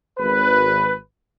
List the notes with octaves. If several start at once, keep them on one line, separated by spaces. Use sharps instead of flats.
G#1 B4